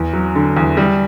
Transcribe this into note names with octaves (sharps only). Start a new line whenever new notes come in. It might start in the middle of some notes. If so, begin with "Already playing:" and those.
Already playing: E2
F#3
D3
E2
G3